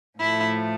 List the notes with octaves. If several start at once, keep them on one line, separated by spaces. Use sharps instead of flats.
A2 F3 A3 E4